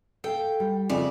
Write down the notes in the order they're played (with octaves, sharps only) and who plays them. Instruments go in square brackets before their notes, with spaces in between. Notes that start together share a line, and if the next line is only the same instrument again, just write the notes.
[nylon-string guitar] A4 F5 [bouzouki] G5
[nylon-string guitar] G3
[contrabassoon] F2 [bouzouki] C#3 D5 [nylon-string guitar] E4